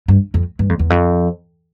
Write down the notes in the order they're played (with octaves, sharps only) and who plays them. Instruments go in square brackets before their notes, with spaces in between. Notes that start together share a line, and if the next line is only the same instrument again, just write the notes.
[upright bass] G2
F2
G2
F2
E2
F2